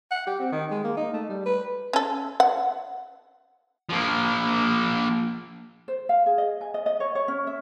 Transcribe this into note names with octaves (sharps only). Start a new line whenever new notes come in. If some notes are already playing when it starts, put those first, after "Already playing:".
F#5
G4
C4
D#3
G#3
A#3
D#4
A3
G3
B4
C#4 A4
F#5
F3 A#3
C5
F5
G#4
D#5
G#5
D#5
D#5
C#5
C#5
C#4
E5